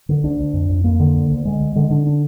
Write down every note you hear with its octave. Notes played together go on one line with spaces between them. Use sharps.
D3
D2 D4
D2
F2
F2
F2 A#3
D3
D2
D2
D3 G#3
D2
D3 G#3
D3 D4
D4